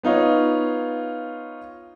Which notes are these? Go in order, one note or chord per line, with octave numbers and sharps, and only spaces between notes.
B3 D#4 F4 C#5